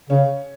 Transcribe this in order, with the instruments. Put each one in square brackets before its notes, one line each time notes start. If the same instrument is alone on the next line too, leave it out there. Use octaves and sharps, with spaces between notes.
[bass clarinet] C#3 [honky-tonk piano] C#4